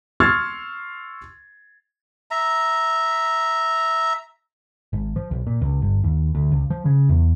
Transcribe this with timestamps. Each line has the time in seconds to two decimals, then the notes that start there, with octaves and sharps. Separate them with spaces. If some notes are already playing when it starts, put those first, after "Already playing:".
0.20 C6 C#6 E6 F6 G#6 A6
2.31 E5 A#5
4.93 G#1
5.16 F3
5.31 B1
5.47 A#2
5.61 C#2
5.82 G1
6.04 D#2
6.35 D2
6.52 C#2
6.70 F3
6.85 C#3
7.09 E2